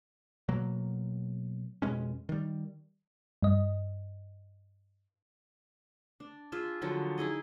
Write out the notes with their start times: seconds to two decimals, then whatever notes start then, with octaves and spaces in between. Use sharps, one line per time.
0.49 B2 F#3 A#3
1.82 F2 B2 G#3 C#4
2.29 D#3 G3
3.42 G2 D#5
6.20 D4
6.52 F4 G#4 E5
6.82 D3 F3 F#3
7.18 D#4 E4 G#4 D#5